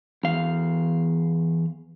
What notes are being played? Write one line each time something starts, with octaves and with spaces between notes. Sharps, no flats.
E2 F5